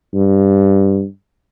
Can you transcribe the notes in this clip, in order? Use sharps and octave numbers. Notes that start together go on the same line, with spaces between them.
G2